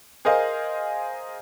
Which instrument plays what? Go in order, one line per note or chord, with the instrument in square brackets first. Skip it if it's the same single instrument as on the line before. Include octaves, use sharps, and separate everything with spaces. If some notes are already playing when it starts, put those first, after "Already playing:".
[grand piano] G#4 A#4 C5 D#5 F5